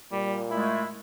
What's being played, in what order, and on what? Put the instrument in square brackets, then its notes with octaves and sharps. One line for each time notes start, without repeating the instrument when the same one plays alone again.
[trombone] A#2 [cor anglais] G3
[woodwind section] G#3 A3 [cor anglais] E4